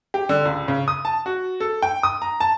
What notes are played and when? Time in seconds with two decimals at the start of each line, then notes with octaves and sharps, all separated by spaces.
0.14 G4
0.29 D3
0.45 C#2
0.68 C#3
0.88 D#6
1.05 A5
1.26 F#4
1.60 A4
1.82 G5
2.03 D#6
2.22 A#5
2.40 A5